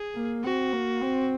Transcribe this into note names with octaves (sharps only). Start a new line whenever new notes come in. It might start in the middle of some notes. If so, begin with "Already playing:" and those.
Already playing: G#4
A#3
C4 F#4
A#3
C4